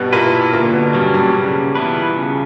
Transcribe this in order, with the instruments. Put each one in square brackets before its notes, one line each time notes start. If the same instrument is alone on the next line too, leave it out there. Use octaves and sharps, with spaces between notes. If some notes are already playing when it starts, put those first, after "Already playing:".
Already playing: [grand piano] G2 B2 G3 B3
[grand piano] A#2 A#3 [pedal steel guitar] E4 B4
[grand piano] A#2 A#3 [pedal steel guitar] D3
[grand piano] B2 B3
[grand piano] G2 G3 [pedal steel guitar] F#3 A#3 C#4
[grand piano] G2 G3
[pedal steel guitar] C#3
E3 B3 E4 B4
C#3